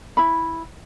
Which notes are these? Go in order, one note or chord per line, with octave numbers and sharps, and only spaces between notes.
E4 B5